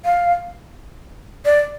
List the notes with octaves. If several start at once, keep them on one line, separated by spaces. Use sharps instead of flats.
F5
D5